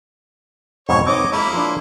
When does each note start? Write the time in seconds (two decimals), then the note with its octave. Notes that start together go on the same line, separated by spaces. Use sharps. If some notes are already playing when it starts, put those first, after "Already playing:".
0.89 F2 G#2 B2 C#5 C#6
1.07 C4 D#4 B4 C#5 D#5 D6
1.32 G#3 A#3 E4 B5
1.53 F3 D4 C6